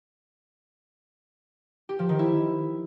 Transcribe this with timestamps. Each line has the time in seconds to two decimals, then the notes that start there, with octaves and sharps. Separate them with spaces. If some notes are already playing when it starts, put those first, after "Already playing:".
1.89 G4
1.99 F3
2.09 D#3
2.19 E4